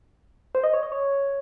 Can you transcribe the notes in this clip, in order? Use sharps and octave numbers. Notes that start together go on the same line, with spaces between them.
C5
D#5
C#5
D#5
C#5